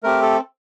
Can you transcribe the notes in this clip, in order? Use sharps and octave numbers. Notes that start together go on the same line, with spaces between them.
A3 C4 G4 A#4
A4